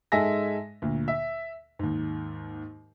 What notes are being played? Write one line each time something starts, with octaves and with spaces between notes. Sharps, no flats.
G#2 G#3 A4 E5 G#5 A#6
D2 A#2
E5
D#2 G#2